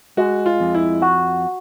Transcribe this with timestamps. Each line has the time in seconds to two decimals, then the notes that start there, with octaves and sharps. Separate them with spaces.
0.17 G#3 F#4
0.46 F4
0.60 F2
0.75 E4
1.02 F#4